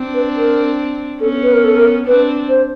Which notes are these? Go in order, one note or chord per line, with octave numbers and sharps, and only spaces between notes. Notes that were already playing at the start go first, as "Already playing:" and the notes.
Already playing: C4 D4
B4
A#4
B3 C#4 A4
B4
A#4
A4
A#4
C4 D4 B4
C5